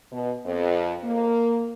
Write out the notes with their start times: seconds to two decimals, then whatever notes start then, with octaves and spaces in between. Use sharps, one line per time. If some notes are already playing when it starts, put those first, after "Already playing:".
0.12 B2
0.45 F2
1.04 A#3